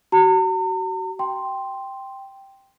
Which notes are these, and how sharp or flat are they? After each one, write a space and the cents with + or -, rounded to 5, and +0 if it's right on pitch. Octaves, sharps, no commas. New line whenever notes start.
F#4 +30 A#5 -45
G5 +0 C6 +0